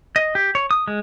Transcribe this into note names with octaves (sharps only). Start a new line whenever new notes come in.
D#5
G4
C#5
D#6
G#3